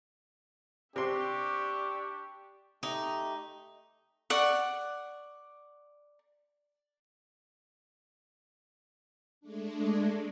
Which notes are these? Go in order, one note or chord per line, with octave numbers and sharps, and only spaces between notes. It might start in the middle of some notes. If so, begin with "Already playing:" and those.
C3 D4 G4 E5 C6 C#6
A3 D#4 G4
D5 F#5 C#6
G#3 A3 D4